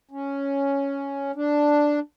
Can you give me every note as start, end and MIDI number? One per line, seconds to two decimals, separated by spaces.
0.11 1.32 61
1.36 1.99 62